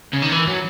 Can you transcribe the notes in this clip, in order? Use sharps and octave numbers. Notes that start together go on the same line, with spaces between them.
C#3
D#3
E3
F#3